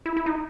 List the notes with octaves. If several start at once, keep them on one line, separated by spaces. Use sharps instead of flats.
E4
E4
D#4